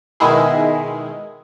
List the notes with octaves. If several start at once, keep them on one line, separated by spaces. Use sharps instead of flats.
B2 D#3 G#3 E4 G#4